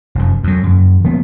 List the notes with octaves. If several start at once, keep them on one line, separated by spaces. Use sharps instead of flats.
F1 F#2
F2 F#3
F#2 C#3
C#3 F3 A#3 B3